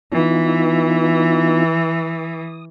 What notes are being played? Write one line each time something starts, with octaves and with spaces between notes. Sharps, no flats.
E3 B3 D#4 F4
D#6